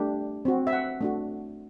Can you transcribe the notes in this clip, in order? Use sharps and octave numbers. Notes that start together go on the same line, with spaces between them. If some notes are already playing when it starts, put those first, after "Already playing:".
Already playing: A3 D4 G4
C4 F#4
E5
F#5
A3 D4 F#4